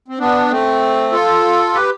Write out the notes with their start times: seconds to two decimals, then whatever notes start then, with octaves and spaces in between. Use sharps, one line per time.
0.08 C4
0.19 B3 D4
0.50 A3 C4
1.12 F4 A4
1.74 G4 B4